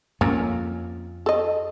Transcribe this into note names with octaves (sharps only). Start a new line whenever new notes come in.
F2 A#3 C#4
A4 D#5